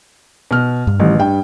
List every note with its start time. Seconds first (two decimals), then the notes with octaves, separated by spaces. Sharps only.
0.51 B2 F6
0.87 G2
1.00 A1 D#3 E3 G3
1.20 G2 G5